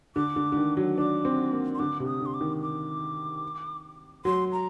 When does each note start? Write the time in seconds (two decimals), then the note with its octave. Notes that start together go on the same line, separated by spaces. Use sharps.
0.16 D3 D6
0.36 D3
0.52 D3
0.57 D#3
0.77 F#3
0.97 D4 D6
1.25 C4
1.52 A#3
1.75 C6
1.79 D3 D6
2.00 C3
2.06 D#6
2.21 D3
2.26 C6
2.34 D6
2.41 D#3
2.62 D6
4.25 F#3 C6
4.52 A#5